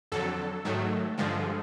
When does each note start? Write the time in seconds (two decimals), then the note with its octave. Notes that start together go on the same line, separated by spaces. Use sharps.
0.12 F2 D3 F#3 A4
0.65 G#2 D#3 F#3 A3
1.18 G2 D3 F3 G#3